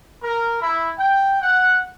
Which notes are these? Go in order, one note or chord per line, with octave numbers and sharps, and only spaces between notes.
A#4
E4
G5
F#5